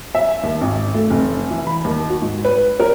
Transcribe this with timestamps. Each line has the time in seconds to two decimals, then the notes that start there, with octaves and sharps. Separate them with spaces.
0.15 E5
0.43 D#2
0.61 G#1
0.94 A3
1.10 F1
1.50 E3
1.67 B5
1.84 D#2
2.09 F#4
2.22 G#2
2.45 B4
2.80 A#4